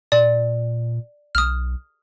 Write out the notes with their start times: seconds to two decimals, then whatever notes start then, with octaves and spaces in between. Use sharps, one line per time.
0.12 A#2 D5
1.35 B1 D#6 F6